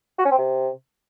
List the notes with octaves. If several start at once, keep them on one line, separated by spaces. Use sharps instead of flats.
F#4
C#4
C4
C3